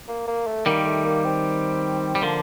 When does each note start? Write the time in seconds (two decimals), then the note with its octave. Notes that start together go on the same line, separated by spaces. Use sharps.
0.08 A#3
0.28 A#3
0.47 A3
0.66 D#3 G3 A#3
0.86 A3
1.05 A#3
1.25 C4
2.15 G3
2.22 D3 F3 A#3